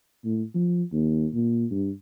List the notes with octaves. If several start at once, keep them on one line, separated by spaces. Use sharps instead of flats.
A2
F3
D#2
A#2
G2